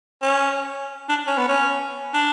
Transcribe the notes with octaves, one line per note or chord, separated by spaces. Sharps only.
C#4
D4
C#4
B3
C#4
D4